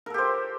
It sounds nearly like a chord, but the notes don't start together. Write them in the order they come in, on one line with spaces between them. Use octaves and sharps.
A#4 A4 G4 C5